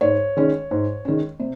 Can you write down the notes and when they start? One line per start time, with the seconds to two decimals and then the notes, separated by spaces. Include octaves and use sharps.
0.01 G#2 C#5
0.37 D#3 G#3 C#4
0.71 G#2
1.05 D#3 G#3 C#4
1.40 C3